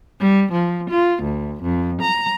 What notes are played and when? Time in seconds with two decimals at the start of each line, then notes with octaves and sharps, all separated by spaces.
0.20 G3
0.52 F3
0.90 F4
1.23 D2
1.62 F2
2.01 A#5